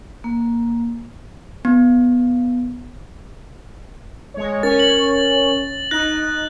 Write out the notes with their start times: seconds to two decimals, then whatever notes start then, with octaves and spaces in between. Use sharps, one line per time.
0.24 A#3
1.65 B3
4.34 G#3 C#5
4.63 C#4 A#4 C#5 A6
4.79 F#7
5.91 D#4 F#6 A#6